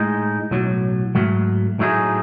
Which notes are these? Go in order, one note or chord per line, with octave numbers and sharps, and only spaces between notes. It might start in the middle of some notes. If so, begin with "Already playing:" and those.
Already playing: A2 G#3 D#4
B1 A2 F#3
G#2 F#3 A3
A2 F#3 A3 D#4 G#4